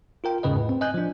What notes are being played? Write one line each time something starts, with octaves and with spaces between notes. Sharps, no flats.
F4 A#4 G5
E2 G#2 C#3 B4 D#5
A2
C4
D#5 G#5 F#6 G6
F3 D4